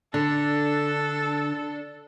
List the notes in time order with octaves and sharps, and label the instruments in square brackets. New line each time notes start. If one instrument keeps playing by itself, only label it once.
[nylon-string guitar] D3 [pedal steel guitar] D4 [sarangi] A4